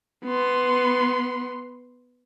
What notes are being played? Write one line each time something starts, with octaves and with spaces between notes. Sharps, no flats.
B3 C6